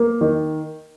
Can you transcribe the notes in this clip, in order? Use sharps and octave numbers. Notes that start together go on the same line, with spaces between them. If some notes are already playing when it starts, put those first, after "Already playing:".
Already playing: A#3
D#3